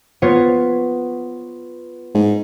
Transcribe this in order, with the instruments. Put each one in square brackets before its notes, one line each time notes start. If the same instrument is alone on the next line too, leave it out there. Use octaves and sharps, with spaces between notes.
[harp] B3 F4 C#5
[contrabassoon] G#2